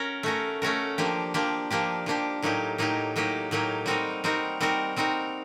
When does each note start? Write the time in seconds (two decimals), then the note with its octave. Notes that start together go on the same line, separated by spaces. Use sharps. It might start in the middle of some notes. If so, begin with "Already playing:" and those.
Already playing: C#4 F#4 A#4
0.23 A3 C#4 F#4 A#4
0.62 A3 C#4 F#4 A#4
0.98 F3 A#3 D4 G4
1.34 F3 A#3 D4 G4
1.71 F3 A#3 D4 G4
2.06 F3 A#3 D4 G4
2.43 A2 F#3 A#3 D#4 G4
2.78 A2 F#3 A#3 D#4 G4
3.16 A2 F#3 A#3 D#4 G4
3.51 A2 F#3 A#3 D#4 G4
3.86 G3 C4 D#4 F#4 A#4
4.24 G3 C4 D#4 F#4 A#4
4.61 G3 C4 D#4 F#4 A#4
4.96 G3 C4 D#4 F#4 A#4